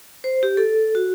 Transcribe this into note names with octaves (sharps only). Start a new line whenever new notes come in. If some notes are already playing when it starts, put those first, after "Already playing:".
C5
G4
A4
F#4